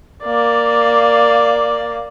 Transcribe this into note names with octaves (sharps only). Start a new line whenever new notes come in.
A#3 D5